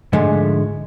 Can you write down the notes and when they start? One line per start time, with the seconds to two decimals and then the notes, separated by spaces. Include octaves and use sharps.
0.13 G#2 D3 F3 G#3 A3